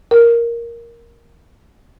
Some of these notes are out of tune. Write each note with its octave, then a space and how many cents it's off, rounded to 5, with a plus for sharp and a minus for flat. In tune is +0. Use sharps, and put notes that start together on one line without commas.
A#4 +5